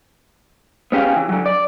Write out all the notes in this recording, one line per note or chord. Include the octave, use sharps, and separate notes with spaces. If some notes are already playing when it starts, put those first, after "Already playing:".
B3 C#4 G4 G#4 F5
E3
D3 F#3
D5